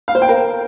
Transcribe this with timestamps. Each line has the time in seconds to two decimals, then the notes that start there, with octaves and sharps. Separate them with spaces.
0.08 F5
0.15 C5
0.22 G5
0.29 A#4